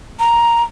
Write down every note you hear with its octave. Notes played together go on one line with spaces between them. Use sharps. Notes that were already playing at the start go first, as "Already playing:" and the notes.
A#5